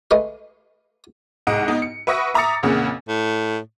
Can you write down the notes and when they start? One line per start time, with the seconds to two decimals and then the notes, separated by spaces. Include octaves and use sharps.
0.11 G#3 A3 B4 F5
1.47 C2 G#2 G#3 D#5 F#5 D7
1.68 B3 D#4
1.82 C#7
2.07 B4 E5 F#5 C#6 D#6 A#6
2.34 E5 A#5 D6 D#6 A6 C#7
2.63 F2 A#2 C#3 E3 F#5
3.08 A2